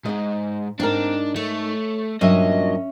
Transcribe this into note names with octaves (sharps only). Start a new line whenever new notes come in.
G#2 D#4 D#5
G#2 C4 D4 D#4 A#4
A3 C#5
G2 A#2 F#3 C#4 D#5 E5